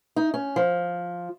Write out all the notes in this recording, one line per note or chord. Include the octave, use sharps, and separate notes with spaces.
D#4
C#4
F3